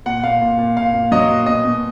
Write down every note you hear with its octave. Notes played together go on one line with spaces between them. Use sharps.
A#2 F#5
A#2 F5
A#2
A#2
A#2 F5
A#2
F#3 D#5
A#2
B2 D#5
B2